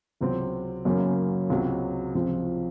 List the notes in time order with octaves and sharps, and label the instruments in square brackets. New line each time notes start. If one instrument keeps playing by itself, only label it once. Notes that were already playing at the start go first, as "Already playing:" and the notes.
[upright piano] C#2 C3 F#3 C4
F#2 C#3 F#3 A#3
C#2 C3 F#3
C#2 C3 F3 C4